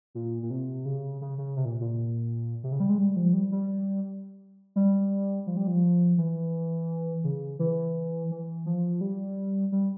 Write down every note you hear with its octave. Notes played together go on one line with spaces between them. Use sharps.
A#2
A#2
C3
C#3
C#3
C#3
C3
A#2
A#2
C3
C#3
G3
G#3
G3
F3
G3
G3
G3
F3
G3
F3
E3
C#3
E3
E3
F3
G3
G3